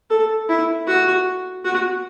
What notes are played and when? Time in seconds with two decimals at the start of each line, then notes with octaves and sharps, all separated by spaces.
0.10 A4
0.49 E4
0.87 F#4
1.65 F#4